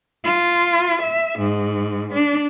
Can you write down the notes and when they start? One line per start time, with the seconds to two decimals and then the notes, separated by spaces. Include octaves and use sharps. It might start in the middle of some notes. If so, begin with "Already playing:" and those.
0.24 F4
1.02 E5
1.39 G#2
2.14 D4